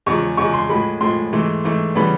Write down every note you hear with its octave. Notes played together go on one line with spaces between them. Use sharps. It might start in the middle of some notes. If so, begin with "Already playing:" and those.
E2 C#3 F3 G#3 C#6
E2 C#3 F3 G#3 C#6
C6
A2 F3 G#3 B5
A2 F3 G#3 C6
G#2 E3 A3
G#2 E3 A3
C#3 E3 G3 B3 B5